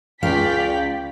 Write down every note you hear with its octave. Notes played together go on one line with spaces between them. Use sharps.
C#2 D5 F5 G5 B6